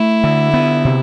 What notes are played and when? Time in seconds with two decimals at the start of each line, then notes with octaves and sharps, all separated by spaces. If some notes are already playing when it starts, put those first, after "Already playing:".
Already playing: A3 E4
0.24 D3
0.54 B3
0.85 C3